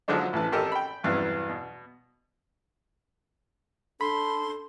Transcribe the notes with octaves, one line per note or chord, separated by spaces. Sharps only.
D3 F3 F#3 G#3 D4 D#4
A1 E3 A5
G#1 G4 A4 A#4 D#5
G5 B5
E2 G2 C3 E3 F#3 B3
B2
D4 A4 B5 C6